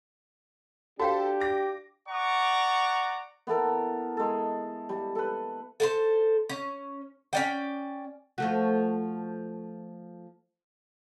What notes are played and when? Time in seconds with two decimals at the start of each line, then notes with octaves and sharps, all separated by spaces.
0.99 D4 F#4 G4 A4 C5 F5 G5
1.40 D6 A#6
2.09 D5 F#5 A#5 C#6 D6
3.47 B3 E4 A4 A#4
4.17 G#3 A4
4.89 G3
5.15 A4 B4
5.80 A4 A#4 C5
6.49 C#4
7.33 C#4 D5 G5
8.38 F3 A3 F#4